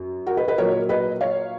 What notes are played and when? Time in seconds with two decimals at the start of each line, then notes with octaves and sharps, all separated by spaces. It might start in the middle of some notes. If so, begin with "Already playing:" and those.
Already playing: F#2
0.27 F#4 A#4
0.37 B4 D#5
0.48 B4 D#5
0.58 A#2 F#3 A#3 A#4 C#5
0.89 B4 D#5
1.21 C#5 F5